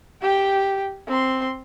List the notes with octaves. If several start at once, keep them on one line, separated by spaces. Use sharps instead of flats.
G4 G5
C4 C6